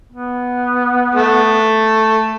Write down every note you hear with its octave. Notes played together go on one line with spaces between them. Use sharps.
B3
A3